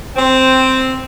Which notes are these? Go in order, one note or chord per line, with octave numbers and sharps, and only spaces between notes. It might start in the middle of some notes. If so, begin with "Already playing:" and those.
C4